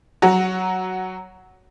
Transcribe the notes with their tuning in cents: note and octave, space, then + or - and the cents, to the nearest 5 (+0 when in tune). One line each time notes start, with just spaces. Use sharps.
F#3 +10 F#4 +0 A#5 +0